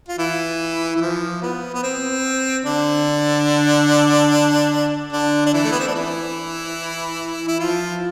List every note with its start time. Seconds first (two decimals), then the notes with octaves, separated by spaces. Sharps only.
0.08 F4
0.19 E3 E4
0.96 E3
1.01 F3
1.43 B3
1.74 B3
1.84 C4
2.65 D3 D4
5.12 D3 D4
5.46 D4
5.53 E3 E4
5.64 A3
5.72 B3
5.79 C4
5.88 D4
5.95 E3 E4
7.48 E4
7.59 F3 F4